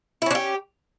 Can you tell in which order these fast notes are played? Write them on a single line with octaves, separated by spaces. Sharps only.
E4 C#4 D4 G4